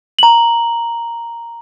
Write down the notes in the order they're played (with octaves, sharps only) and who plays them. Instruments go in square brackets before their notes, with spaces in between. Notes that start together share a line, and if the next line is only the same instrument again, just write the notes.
[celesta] A#5 F#7